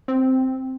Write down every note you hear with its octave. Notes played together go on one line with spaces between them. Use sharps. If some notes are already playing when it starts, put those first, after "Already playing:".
C4